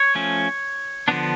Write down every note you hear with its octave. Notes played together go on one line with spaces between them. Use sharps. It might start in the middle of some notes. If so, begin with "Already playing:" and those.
Already playing: C#5
F3 A3 C#4
D3 F3 B3 D4